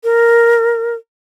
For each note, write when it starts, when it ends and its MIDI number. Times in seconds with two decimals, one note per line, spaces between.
0.04 0.94 70